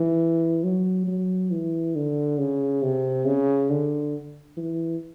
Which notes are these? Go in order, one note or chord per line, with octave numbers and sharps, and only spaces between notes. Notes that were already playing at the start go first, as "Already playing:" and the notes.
Already playing: E3
F#3
F#3
E3
D3
C#3
C3
C#3
D3
E3